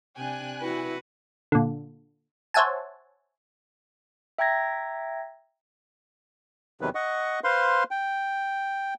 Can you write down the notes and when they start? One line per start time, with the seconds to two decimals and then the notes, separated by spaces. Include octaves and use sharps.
0.17 C3 D4 G5 G#5 F#6
0.61 E4 F#4 B4
1.52 A#2 D3
2.54 C5 C#5 E5 F#5 G#5 A5
4.38 E5 G5 A#5 G#6 A#6
6.81 E2 C3 D#3 F#3 B4
6.95 D#5 F#5 C#6
7.44 B4 C5 F5 C6
7.91 G5